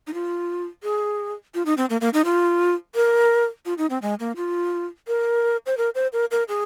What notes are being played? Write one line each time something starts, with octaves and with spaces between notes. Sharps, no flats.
D#4
F4
G#4
F4
D#4
C4
A#3
A#3
D#4
F4
A#4
F4
D#4
C4
G#3
A#3
F4
A#4
C5
A#4
C5
A#4
A#4
G#4